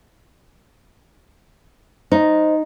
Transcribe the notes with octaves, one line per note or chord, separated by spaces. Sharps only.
D#4 C5 D#5